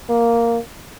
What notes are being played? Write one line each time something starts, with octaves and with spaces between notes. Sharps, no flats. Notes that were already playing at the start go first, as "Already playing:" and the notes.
A#3